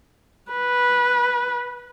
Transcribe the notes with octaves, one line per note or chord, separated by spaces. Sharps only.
B4